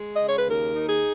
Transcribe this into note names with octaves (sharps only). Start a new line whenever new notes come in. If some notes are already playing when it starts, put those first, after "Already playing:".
Already playing: G#3
D#5
C#3 C#5
B4
D#2 A#4
D#4
G#4